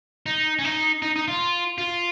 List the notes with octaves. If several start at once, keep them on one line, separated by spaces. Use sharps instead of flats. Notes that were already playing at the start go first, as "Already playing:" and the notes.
D#4
C#4
D#4
D#4
D#4
F4
F4